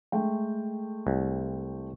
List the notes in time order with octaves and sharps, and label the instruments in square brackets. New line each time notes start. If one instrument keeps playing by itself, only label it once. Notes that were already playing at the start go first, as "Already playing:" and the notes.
[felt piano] G#3 A3 G5
[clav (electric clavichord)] C2